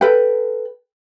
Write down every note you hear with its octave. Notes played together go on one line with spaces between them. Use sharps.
A4 B4 G5